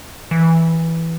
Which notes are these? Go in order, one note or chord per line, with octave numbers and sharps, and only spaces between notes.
E3